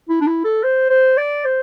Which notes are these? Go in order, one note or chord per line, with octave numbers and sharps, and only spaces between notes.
E4
D4
E4
A4
C5
C5
D5
C5